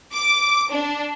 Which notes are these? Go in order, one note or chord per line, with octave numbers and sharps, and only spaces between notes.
D6
D4